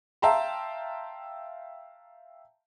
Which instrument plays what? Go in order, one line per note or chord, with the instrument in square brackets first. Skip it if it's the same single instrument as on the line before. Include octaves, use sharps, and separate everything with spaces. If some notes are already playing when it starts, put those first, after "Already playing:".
[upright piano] E5 F5 G5 A5 A#5 C6